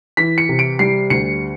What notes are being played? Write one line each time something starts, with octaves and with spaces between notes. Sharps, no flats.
E3 B6
C#7
C3
D7
G3 C7
D2 C#7